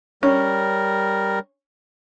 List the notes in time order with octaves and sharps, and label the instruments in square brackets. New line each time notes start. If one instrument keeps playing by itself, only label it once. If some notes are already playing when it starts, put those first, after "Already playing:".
[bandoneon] G3 A#4 [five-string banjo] C#4